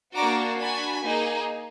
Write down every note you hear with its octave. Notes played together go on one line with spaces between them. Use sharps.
A#3 D4 F#4 A#5 D6
D4 F#4 G#5 B5
A#3 D#4 G#4